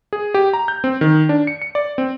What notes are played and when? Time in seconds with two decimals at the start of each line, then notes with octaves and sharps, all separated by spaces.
0.13 G#4
0.34 G4
0.53 A#5
0.68 G6
0.84 C4
1.01 D#3
1.29 D4
1.47 C#7
1.62 C#7
1.75 D5
1.98 C4